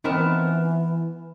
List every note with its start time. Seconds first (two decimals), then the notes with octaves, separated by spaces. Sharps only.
0.04 E3 B3 C4 D#4 A#4 A5